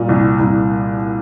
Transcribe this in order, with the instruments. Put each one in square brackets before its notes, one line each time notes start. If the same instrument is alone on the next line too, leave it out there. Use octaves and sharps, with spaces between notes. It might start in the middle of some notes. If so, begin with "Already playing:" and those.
Already playing: [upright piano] A#2 G3
C2
C2